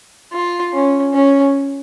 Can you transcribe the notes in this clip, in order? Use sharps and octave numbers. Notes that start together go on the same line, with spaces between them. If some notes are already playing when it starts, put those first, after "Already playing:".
F4
C#4
C#4